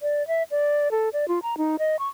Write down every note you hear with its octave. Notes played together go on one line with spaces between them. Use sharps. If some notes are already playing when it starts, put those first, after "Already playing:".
D5
E5
D5
A4
D5
F4
A#5
D#4
D#5
C#6